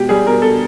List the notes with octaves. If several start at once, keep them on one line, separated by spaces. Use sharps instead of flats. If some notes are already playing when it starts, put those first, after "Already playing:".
Already playing: B2 G#3 G4
G3 G#4
B2 A#4
B2 A4